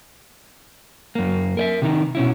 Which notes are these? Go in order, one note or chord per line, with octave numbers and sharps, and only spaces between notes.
F#2 A#3
A#4 D#5 E5
C3 D#3 D#4
B2 C#4 E4